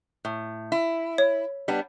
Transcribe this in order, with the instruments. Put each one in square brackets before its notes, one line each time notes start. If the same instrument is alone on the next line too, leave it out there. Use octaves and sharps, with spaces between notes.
[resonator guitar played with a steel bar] A2
E4
[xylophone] C#5
[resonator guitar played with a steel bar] G3 B3 D4